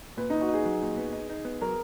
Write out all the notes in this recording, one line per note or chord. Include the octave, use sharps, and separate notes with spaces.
A#2 B4
D#4
A#2
F#4
D#4 G#4
F#3
A#2
B3
D#4
D#4
B3
F#3 A#4